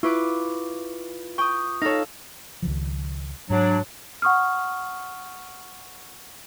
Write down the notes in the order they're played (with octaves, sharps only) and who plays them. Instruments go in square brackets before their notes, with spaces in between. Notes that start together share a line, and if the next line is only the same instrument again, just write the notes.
[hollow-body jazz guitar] E4 [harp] F4 B4 D6 [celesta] C#6
[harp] G5 D#6 [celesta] C#6
[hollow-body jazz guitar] D#4 C#5 [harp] A4 F5 [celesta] A#6
[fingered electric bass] C#2 D#3 F3
[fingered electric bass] G#2 [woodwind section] F#3 D4
[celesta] F#5 C#6 D#6 F6